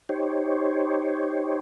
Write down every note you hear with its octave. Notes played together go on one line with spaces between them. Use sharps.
D#4 G4 C5 C#5